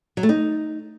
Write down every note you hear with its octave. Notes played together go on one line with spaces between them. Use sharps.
F#3
A3
D#4